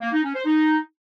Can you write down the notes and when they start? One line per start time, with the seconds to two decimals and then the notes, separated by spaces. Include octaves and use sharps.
0.01 A#3
0.12 D#4
0.23 C#4
0.34 C5
0.45 D#4